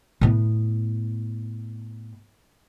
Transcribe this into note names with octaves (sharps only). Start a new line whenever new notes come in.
A2 B3